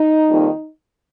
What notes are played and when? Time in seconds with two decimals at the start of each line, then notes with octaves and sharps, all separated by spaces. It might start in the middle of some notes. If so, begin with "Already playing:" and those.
Already playing: D#4
0.29 F2 D#3 G3 A#3